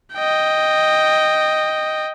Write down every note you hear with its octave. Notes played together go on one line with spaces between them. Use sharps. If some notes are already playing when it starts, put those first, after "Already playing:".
D#5 G5